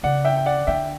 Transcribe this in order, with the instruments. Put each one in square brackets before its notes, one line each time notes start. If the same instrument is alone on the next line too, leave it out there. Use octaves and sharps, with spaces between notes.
[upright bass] C#3 [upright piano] D5 F#5
[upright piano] E5 G5
G5
D5 F#5
[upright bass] D3 [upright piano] E5 G5